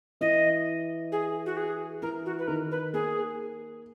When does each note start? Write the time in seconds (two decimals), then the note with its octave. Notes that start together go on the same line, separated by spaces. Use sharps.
0.21 E3 D#5
1.12 G#4
1.46 F#4
1.57 G#4
2.02 E3 A#4
2.26 F#4
2.39 B4
2.47 D#3 A#4
2.71 B4
2.93 A#3 G#4